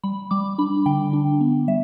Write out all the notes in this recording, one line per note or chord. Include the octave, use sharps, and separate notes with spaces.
G3 B5
G3 D6
D4 B5
D3 G5
D4
B3
G3 E5